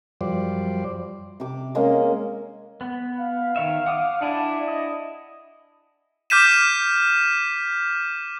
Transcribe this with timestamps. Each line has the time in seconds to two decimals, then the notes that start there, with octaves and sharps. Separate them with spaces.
0.21 F#2 F3 G3 C5 D5
1.40 C3 D6
1.75 G#3 A#3 C#4
2.81 B3
3.20 F5
3.56 D#3 C#5 E5
3.86 F#5 D6 D#6
4.21 D4 E4 G#4 F#5
4.67 D#5
6.30 D6 F6 G6 B6 D#7 E7